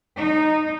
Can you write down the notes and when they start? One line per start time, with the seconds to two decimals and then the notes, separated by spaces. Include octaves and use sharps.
0.16 D#4